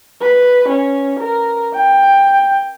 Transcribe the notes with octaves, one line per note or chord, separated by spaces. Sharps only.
B4
C#4
A#4
G5